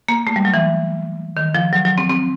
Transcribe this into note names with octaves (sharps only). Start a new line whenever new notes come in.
A#3
A3
G3
F#3
E3
D#3
F3
F#3
F#3
C4
C4